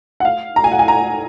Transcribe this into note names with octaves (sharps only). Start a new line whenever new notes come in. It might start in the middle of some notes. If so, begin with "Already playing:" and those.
F#5
F5
A#5
G#5
F#5
G#5
A#5